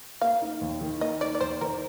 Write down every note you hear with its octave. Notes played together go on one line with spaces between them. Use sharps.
A#3 F5
D#4
D#2
D#3
A#3 D#5
D#4 D5
D5
D#2 C5
D#3 A#4